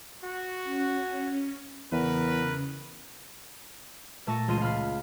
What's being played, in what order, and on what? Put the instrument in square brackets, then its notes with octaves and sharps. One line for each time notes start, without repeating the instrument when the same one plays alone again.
[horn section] F#4
[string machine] C#4
[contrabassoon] E2 [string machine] C#3 [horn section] A#4 B4
[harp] A#2 A3 A5 C#6 A#6 D#7
E1 C#2 F4 C6 D#7
F4 F5 B5 F6